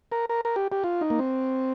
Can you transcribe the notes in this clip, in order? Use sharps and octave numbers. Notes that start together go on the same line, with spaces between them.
A#4
A#4
A#4
G4
G4
F4
D#4
A#3
C4